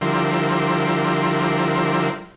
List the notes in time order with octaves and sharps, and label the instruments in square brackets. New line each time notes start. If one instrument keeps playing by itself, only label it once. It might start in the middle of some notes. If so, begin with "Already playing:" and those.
[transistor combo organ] D3 F3 G3 E4 A#4 C5